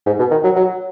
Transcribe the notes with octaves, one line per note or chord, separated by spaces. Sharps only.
G#2
B2
D#3
F#3
F#3